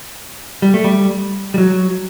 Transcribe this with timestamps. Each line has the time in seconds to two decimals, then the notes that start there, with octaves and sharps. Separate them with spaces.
0.62 G3
0.74 A3
0.84 G3
1.54 G3
1.58 F#3